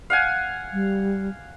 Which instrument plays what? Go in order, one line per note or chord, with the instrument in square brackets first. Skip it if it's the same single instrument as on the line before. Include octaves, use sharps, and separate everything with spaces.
[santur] F5 F#5 G#5
[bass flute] G3